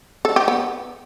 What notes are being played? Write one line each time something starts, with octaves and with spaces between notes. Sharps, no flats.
A4
G4
B3